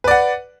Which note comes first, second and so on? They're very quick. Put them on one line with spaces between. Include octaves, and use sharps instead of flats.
B4 D5 F#5